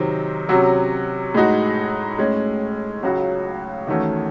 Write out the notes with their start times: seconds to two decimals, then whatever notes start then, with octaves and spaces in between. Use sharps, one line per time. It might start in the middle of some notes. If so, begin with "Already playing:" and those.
Already playing: C3 D#3 F#3 C4
0.49 C3 F#3 C#4 F#4
1.34 A2 G#3 D#4 F#4
2.18 A2 G#3 C#4
3.03 C#2 C#3 F#3 C#4 F#4
3.87 E2 D#3 A3 C#4 F#4